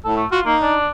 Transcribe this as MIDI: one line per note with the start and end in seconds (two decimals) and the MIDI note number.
0.05 0.23 45
0.05 0.16 69
0.16 0.26 57
0.31 0.42 65
0.31 0.40 66
0.45 0.56 58
0.45 0.76 63
0.62 0.88 62